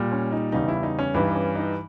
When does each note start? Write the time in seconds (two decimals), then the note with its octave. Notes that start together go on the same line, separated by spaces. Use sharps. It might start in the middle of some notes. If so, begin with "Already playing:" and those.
Already playing: A#2 G3
0.12 C#4
0.32 D#4
0.52 E2 C#3 G3 D#4
0.68 E4
0.83 D#4
0.99 C#4
1.14 G2 E3 G3 D#4
1.35 C#4
1.55 D#4